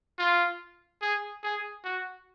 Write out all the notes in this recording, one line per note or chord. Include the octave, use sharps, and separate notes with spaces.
F4
G#4
G#4
F#4